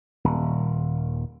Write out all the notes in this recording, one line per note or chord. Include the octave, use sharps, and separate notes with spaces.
D#1